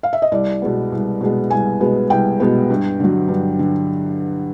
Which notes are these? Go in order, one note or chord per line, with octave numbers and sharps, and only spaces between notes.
F5
E5
D#5
C2 D5
B2 G#3 B3
C2
B2 G#3 B3
C2 G#5
B2 G#3 B3
C2 G5
B2 G#3 B3
G2
D3 F#3
G2
D3